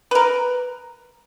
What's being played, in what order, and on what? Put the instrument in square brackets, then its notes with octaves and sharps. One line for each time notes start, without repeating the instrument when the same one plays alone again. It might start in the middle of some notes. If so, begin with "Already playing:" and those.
[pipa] A#4 B4